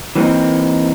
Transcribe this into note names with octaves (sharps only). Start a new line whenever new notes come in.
E3 F#3 A#3 C4 D#4